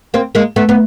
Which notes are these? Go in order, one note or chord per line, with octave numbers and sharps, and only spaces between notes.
A#3 C4
G#3 A#3
A3 B3
B3